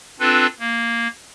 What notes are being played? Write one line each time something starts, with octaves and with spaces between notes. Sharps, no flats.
C4 D4 F4 A4 B4
A#3